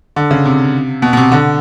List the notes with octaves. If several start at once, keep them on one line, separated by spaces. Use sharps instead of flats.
D3
C#3
C3
B2
B2
C3
D3